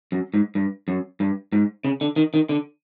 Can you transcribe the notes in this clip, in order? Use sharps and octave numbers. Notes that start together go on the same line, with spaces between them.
F#2
G#2
G2
F#2
G2
G#2
C#3
D3
D#3
D#3
D3